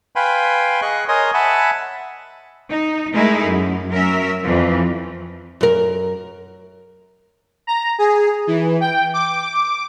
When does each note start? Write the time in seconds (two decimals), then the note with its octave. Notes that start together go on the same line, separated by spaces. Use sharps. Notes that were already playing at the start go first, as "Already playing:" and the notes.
0.16 B4 F5 G5 G#5 B5 C6
0.82 G#4 D#5 C#6 F#6
1.08 A#4 C#5 D#5 G#5 C6 D#6
1.34 E5 F#5 G#5 A5 B5
2.70 D#4
3.14 G#3 A3 D#4 E4 G#4 A#4
3.45 F#2
3.92 F#3 C#4 A#4 E5
4.44 F2 E3 F3
5.61 F#2 A#4
7.67 A#5
7.99 G#4
8.47 E3
8.81 G5
9.14 D6